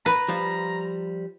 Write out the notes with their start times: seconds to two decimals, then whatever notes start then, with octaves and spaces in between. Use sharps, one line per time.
0.06 B4 A#5
0.29 F3 G3 F4